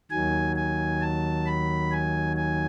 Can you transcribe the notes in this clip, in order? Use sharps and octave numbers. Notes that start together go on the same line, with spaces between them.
D#2 D#3 F#3 G#5
G#5
A5
B5
G#5
G#5